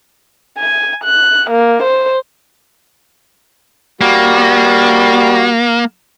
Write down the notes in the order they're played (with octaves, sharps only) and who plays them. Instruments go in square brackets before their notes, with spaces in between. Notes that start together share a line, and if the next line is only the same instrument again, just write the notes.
[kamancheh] G#5
F#6
A#3
C5
[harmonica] G3 F#4 [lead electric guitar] A#3